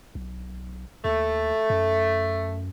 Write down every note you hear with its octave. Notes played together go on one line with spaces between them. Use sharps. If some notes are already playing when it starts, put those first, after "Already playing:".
B1
D#2 A3
F#2